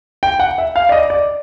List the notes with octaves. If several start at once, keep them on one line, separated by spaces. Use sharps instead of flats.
G5
F#5
E5
F5
D5
D#5
D5